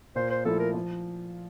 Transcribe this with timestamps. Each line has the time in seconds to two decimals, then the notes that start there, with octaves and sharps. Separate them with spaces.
0.16 A#2 C5
0.30 C5
0.45 F3 A3 E4 A4
0.59 A#4
0.74 F3